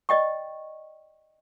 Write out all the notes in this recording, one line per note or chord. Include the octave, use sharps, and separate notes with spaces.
D5 D#5 G5 C#6